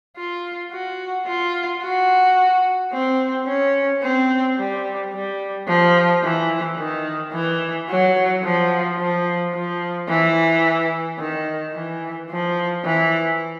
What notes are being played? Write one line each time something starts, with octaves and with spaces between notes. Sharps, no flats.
F4
F#4
F4
F#4
C4
C#4
C4
G3
G3
F3
E3
D#3
E3
F#3
F3
F3
F3
E3
D#3
E3
F3
E3